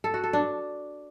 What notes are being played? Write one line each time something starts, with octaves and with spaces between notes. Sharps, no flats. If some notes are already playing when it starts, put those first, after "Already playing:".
A4
F#4
A4
D4